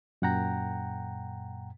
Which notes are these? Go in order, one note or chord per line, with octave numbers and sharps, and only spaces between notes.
F#2 A#2 F#5 G5 A#5